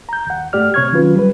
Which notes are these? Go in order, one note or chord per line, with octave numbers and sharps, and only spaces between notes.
A#5 G6
D#2 F#5
G#2 A3 G4 D5 F6
C3 C#5 C#6 F6 G#6
D#3 F#3 C#4 F4 B4
G3 B4